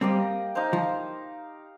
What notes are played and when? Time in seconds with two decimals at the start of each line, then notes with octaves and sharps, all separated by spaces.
0.01 G3 A#3 C4 G4 D#5
0.55 D#4 C5 F5
0.73 F3